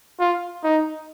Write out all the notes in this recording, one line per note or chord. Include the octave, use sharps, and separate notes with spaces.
F4
D#4